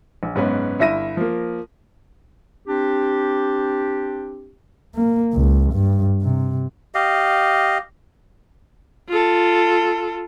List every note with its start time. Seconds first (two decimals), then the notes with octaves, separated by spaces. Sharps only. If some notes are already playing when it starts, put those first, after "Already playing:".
0.23 A#1
0.35 F#1 G#2 B3 C#4 B4 B5
0.79 G1 E4 E5 A#6 D#7
1.17 F3 A#3
2.66 C4 D4 G4
4.94 A#3
5.33 C#2
5.73 G2
6.22 C3
6.95 G4 D#5 F5
9.09 F4 A4